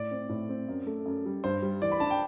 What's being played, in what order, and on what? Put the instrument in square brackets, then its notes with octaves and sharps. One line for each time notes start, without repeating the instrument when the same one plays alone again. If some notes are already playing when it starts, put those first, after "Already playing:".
Already playing: [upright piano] A2 [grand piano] D5
[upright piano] C4
A2
C4
F#2
A3
F#2
G3
[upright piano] G2 [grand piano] C5
[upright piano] G3
[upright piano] E3 [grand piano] D5
[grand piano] B5
[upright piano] D4 [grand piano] A5
[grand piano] G5